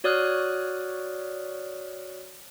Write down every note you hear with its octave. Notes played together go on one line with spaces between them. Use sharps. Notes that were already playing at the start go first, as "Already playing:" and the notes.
F#4 C#5 D5 D#6 F6 F#6